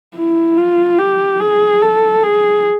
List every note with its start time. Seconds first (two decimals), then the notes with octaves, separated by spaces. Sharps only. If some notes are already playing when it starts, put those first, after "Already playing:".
0.16 E4
0.57 F4
0.98 G4
1.40 G#4
1.82 A4
2.23 G#4